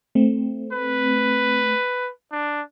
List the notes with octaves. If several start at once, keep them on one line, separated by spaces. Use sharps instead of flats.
A3 C4
B4
D4